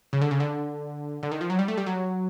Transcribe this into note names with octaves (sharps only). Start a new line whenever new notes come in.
C#3
D3
C#3
D3
D3
D#3
F3
F#3
G3
A3
G3
F#3